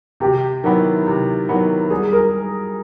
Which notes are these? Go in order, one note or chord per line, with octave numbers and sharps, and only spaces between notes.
C3 G4
D#3 F#3 B3 E4
C3
D#3 F#3 B3 E4
G3 G#4
A#4